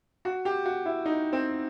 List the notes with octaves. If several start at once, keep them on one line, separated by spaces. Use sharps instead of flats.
F#4
G4
F#4
E4
D#4
C4